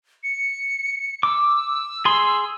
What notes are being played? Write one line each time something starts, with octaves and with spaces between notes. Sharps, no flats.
C#7
D6 E6
G#4 C6